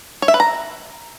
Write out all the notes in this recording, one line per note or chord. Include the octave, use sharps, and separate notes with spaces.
C#5
E5
B4
A#5